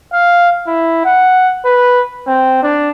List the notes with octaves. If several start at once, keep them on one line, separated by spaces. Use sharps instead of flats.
F5
E4
F#5
B4
C4
D4